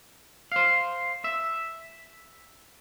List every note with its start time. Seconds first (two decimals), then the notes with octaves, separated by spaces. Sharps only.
0.52 C5 F5
1.24 E5